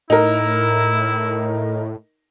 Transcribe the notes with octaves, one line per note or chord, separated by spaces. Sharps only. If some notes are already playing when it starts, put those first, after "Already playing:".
A2 D#4 E4 A#4